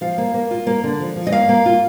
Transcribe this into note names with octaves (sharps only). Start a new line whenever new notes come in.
F3 F5
A#3
A#3
F4
A#3
D3
F3
F3
D#5
A#3 F5
A#3
F4